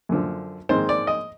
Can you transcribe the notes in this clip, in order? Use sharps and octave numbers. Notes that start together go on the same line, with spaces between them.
F#2 D3 F3
G#2 D#3 G#3 C4 C5
D5
D#5